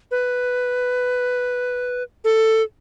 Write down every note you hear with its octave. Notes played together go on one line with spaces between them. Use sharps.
B4
A4